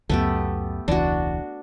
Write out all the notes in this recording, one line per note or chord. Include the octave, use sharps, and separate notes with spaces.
C#2 F#2 A3 B3 G4
E1 C#2 E3 D4 F#4